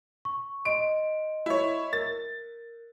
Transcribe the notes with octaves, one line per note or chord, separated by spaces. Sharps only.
C#6
D#5 C6 D7
E4 C#5
A#4 A6